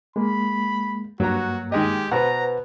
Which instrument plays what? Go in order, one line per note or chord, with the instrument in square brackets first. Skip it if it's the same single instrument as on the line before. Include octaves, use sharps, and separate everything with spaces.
[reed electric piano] G#3 A#3 [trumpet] B5
[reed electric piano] G2 A#3 [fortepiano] F#3 A#5 [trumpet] F#4
[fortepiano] D#3 G#3 D#5 [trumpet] G4
[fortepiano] B2 [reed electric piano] B4 C5 F#5 [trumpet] A#5